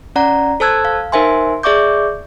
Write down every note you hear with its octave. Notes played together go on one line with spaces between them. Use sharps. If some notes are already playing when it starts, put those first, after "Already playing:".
C#4 D5 F#5 A#5
A4 C5 A5 E6 F#6 G#6
F5
D#4 A#4 C5 E5 G#5 C6
G#4 D5 E5 C#6 D6 G6